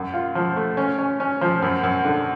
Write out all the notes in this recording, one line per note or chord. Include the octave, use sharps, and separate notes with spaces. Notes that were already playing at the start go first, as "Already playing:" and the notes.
Already playing: F#2
F4
F3
A3
C#4
C#4
C#4
F3
F#2
F#2
D3